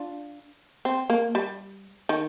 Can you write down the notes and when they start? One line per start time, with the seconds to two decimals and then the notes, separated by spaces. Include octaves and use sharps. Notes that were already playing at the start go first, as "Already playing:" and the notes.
Already playing: D4 F4
0.85 C4
1.10 A#3
1.35 G3
2.09 D#3